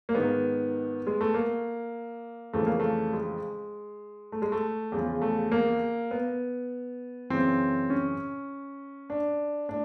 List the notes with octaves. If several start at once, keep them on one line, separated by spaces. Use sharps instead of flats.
A#3
G#2 D#3 B3
G#3
A3
A#3
F2 C#3 E3 A3
A#3
A3
G#3
A3
G#3
A3
E2 C#3 F3
A3
A#3
B3
F#2 C#3 E3 C4
C#4
D4
A2 D4